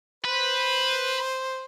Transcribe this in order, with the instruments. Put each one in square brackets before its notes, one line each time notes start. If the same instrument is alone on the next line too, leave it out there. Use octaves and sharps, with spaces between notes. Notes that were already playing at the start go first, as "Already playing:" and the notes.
[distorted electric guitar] B4 [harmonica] C5